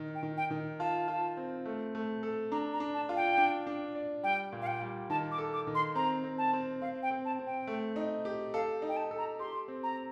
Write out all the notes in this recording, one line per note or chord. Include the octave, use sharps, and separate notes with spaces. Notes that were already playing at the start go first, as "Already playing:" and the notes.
Already playing: D#3
G5
D#3
G5
D#3
F4 A5
F4
C4
A3
A3
A4
D4 A#5
A#5
D4
A5
F4
G5
D4
D4
D5
G3 G5
A#2
F5
G5
G3
D#3 A5
D6
A4
D6
D#3
C6
C4 A#5
C4
A5
C4
C4 F5
G5
C4
A5
C4
G5
A3
D#4
G4
A4 F5
D#4
G5
A5
A4
A#5
G4 C6
C4
A#5